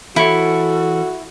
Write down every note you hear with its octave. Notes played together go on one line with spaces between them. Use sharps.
E3 E4 F#4 A4 C#5